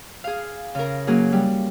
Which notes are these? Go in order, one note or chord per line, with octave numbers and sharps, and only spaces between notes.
G#4 F5
C#3 A#4
F#3 A#3 C#4 G#4
G3